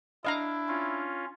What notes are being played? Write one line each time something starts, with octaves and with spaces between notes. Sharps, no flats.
D4 E4 D#5 F5 A#5
C#4 F4